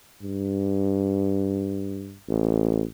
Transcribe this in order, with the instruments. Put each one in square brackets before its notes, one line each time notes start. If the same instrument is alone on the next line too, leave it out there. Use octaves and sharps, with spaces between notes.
[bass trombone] G2
A1